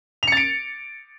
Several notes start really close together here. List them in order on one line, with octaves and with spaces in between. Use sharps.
F7 C#7 A6 D7